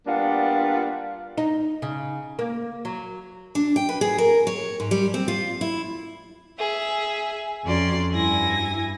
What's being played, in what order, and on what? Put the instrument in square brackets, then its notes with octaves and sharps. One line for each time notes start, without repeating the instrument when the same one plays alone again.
[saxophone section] G3 A#3 B3 D4 F4
[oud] D#4
C#3
A#3
F#3
[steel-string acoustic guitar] D4
G5
B4
G#4
A#4
C#5
G#2
G3
C4
F4
E4
[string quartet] G#4 E5
F2 C#4 F#4 D5 C6
G2 E4 G#5 A#6